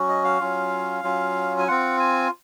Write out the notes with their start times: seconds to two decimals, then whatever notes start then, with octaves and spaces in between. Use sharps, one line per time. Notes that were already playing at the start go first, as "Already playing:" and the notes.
Already playing: F#3 C#4 F#4
0.09 D#5
0.24 F5
0.40 F#3 C#4 F4
1.04 F#3 C#4 F4
1.59 G#5
1.68 C4 F4 F#5
2.00 G#5